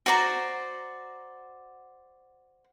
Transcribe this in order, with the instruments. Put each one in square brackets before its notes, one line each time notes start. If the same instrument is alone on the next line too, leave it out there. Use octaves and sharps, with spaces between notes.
[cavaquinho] F#4 C5 D5 A#5